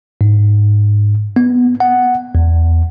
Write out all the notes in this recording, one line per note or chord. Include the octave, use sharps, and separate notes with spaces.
G#2
B3
F#5
E2